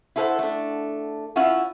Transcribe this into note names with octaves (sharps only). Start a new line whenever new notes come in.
E4 F4 A4 A#4 C5 F#5
A3 D4
C#4 E4 F4 E5 F#5